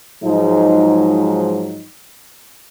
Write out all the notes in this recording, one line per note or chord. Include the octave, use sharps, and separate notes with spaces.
G#2 F3 F#3 G#3 D#4